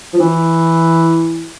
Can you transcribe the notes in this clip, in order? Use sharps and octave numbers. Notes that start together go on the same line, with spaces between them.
F3
E3